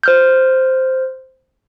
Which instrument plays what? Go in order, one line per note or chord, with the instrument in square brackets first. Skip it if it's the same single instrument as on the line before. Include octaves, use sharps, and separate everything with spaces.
[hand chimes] C5 F6 G6